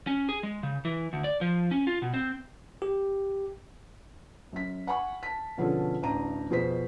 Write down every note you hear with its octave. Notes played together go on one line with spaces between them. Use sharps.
C#4
G#4
G#3
C#3
E3
D2
D5
F3
C#4
F4
B2
C4
G4
F#2 B6
F#5 G#5 B5 C#6
A5 B6
B2 D3 F3 C#4 G#4 A4
A1 D2 D4 A#5 D#7
F2 B2 G#4 C5 B6